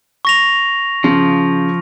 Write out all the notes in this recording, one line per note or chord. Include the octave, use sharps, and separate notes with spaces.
C#6 A#6 F7
C#3 F3